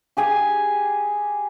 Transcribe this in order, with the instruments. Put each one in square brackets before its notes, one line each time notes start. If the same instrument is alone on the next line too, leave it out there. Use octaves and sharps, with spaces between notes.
[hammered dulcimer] G4 G#4 G#5